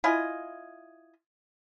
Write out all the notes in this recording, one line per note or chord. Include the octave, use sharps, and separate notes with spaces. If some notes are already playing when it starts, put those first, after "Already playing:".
E4 F4 D#5 G#5